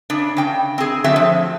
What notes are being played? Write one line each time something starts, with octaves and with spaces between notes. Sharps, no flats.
C#3 D4
C#3 G5
C4 G#4
D3 F#3 A3 C4 E5
F3